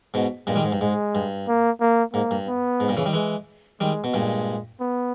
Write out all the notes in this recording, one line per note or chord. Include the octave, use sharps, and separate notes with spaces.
G#2 B2
G2 A#2 G#3
D#3 G3
G#2
G2
G#2 G#3
G2
A#3
A#3
G#2 A#3
G2
B3
G#2
G2 A#2
C#3 E3
D#3 G3
E3 G#3
D#3 G3 G#3
B2
G2 A#2 G#3
B3